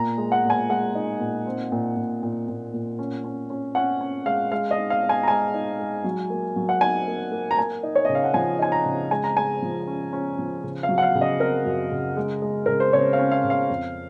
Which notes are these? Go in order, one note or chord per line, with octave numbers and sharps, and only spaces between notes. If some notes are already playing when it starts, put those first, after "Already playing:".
Already playing: A#2 A#5
G#3
F#5
A#2
G#5
G#3 F#5
D#4
A#2
C4
A#2
A#2
A#2
A#2
A#2
C#4
C#4
C#4
C#4 F#5
C#4
G#3 F5
G#3 F5
D#5
D#4
F5
D#4
G#5
A#5
G#3 G#5
D#4
G#3
F#3
A#3
F#3
F#5
D#4 G#5
A#3
A#3
A#5
A#3 G#5
D#4
C#5
C#3 D#5
F5
F#5
F3 G#5
D#4 G#5
A#5
C#3
G#3 G#5
A#5
G#3 G#5
F3
C#4
C#4
F3
C#3
F5
F#3
F#5
F5
C#3
D#5
C4 A#4
F#2
C#3
G#3
G#3
C#3 A#4
C5
C#3 C#5
F5
C#4
F5
C#3
F5
F2